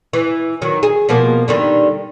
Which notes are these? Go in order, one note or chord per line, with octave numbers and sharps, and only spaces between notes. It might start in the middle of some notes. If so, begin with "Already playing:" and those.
E3
D#3 F#3
G#4
B2 F3 A#3
D3 D#3 G3